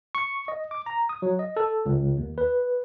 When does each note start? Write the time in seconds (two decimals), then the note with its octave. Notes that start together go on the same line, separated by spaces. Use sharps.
0.15 C#6
0.48 D#5
0.71 D6
0.86 A#5
1.09 D#6
1.22 F#3
1.39 D#5
1.57 A4
1.86 C#2
2.18 D#2
2.38 B4